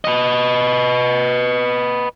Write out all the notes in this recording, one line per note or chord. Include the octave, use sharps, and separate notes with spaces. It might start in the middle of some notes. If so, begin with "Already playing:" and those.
B4 D#5